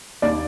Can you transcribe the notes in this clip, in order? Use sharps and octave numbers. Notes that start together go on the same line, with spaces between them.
D#2 D5